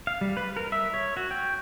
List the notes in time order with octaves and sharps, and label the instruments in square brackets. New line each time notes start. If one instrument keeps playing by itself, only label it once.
[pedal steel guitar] F5
G3
B4
A#4
E5
C#5
F#4
G5